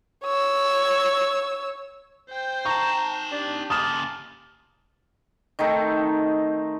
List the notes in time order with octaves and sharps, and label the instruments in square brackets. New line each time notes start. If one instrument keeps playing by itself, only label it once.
[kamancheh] C#5 E6
[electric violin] C5 G5
[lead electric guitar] D#4 A5 [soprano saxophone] A#5 [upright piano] C#6
[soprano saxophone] D4 [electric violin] G4
[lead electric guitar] C#3 A#3 [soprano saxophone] A5 [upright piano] D#6 F6 E7
[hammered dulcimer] D#3 A3 C4 D#4